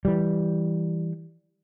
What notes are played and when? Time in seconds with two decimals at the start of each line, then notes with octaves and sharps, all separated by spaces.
0.05 E3 G3